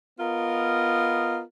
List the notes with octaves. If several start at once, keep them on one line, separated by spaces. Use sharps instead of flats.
B3 F4 A#4 D#5